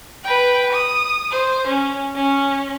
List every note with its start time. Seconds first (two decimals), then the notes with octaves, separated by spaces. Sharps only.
0.24 B4 G5
0.72 D#6
1.31 C5
1.68 C#4
2.15 C#4